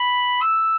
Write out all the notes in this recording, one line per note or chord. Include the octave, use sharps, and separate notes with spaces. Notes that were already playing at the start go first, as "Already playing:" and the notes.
Already playing: B5
E6